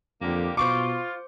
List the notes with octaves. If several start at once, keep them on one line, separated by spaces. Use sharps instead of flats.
F2 D3 A#3 G4
B2 F4 C5 C#6 D6